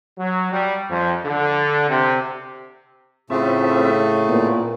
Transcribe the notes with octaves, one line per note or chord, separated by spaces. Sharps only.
F#3
G3
F2
D3
C3
A2 C#3 A3 C4 F4 E5
A#2 B3